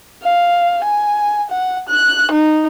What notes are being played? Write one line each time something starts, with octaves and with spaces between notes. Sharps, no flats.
F5
G#5
F#5
F#6
D#4